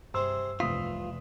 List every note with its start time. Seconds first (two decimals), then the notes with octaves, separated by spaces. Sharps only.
0.14 G2 C3 C4 G#4 C6 E6
0.60 F1 C2 E3 F4 D#6 B6